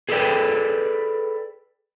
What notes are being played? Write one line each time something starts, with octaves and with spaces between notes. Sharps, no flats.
G#4 A4 B4 C#5 D5 G5